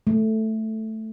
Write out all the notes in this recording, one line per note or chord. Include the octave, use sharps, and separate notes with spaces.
A3